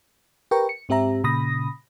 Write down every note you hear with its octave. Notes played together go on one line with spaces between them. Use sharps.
G4 A#4 B4 G5 A#5 C#6
C#7
G#2 C4 G4 E5 A#5
A#2 C#3 B5 D#6 A#6